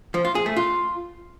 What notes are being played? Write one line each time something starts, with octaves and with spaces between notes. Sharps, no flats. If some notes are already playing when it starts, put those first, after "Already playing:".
F3
F4
G#4
A3
F4